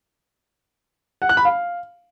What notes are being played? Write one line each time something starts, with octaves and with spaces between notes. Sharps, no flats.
F#5
F#6
B5
F5